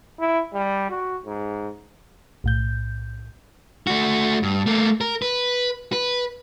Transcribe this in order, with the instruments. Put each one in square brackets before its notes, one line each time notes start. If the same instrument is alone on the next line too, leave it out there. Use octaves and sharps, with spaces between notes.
[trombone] E4
G3
F#4
G#2
[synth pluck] B1 A2 G6
[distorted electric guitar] A3 F#4
G2
A3 A#3
A#4
B4
B4